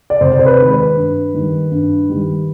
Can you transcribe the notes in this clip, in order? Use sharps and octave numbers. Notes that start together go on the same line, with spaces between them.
D5
C3 C5
D5
C5
B4
D#3 G#3
B4
G2
D#3 G3
G2
D#3 G3